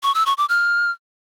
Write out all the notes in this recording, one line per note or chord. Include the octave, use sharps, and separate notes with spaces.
C#6
E6
C#6
D6
F6